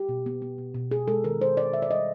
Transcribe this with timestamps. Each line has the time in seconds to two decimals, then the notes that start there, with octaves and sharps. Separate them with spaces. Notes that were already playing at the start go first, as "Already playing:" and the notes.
Already playing: G4
0.09 B2
0.26 B3
0.42 B3
0.58 B2
0.74 B2
0.91 B3 G#4
1.08 G#3 A4
1.24 D#3 A#4
1.41 G#3 C5
1.57 G#3 D5
1.73 D#3 E5
1.82 D5
1.91 G3 D#5